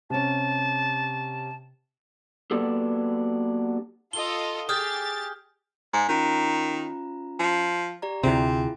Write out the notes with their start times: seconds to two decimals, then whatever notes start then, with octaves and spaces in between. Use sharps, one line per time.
0.10 C3 C#4 A5
2.51 F#3 A#3 B3 D4 G4 A4
4.13 F4 A4 D#5 G7
4.69 G4 G#4 D#6 F6 G6 A6
5.93 G#2
6.09 D#3 C#4 F4 A#5
7.39 F3
8.02 G4 D5 A#5
8.23 D2 C3 C4 E4 F4 G#4